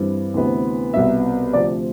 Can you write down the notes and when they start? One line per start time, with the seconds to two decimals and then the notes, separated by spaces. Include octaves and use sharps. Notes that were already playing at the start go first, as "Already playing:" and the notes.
Already playing: G2 E3 G3 C4
0.34 D2 C3 E3 B3
0.93 C2 B2 B3 E5
1.53 D2 C3 F3 A3 C4 D5